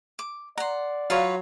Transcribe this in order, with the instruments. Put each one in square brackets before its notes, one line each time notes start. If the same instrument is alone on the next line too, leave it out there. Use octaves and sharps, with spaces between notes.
[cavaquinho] D6
[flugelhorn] D5 [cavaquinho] F#5 C6 [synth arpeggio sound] A#5
[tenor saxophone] F#3 [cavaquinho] F4 B4 C#5 [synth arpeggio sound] F5